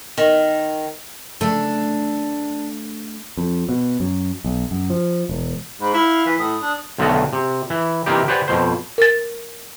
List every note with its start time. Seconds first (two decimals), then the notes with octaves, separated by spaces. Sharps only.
0.18 D#3
1.41 A3 D4
3.37 F2
3.69 B2
4.00 F#2
4.44 B1
4.71 F#2
4.90 F3
5.29 E1
5.81 G#2 B5
5.94 E4 F5
6.26 E3 B6
6.39 A2 D#6
6.62 D4
6.98 B1 D3 D#3 A3 F#4 D#5
7.33 C3
7.70 E3
8.06 C3 E3 A#3 D#4 G4
8.28 G4 B4 C5 D5 F#5 G#5
8.48 F2 B2 C5
8.98 A#4 A6